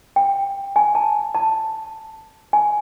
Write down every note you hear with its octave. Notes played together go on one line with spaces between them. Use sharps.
G5
G#5
A5
A5
G#5